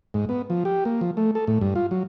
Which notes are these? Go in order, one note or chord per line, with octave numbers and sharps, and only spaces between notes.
G#2
B3
F3
G4
A#3
F3
A3
A4
A2
G2
F4
F#3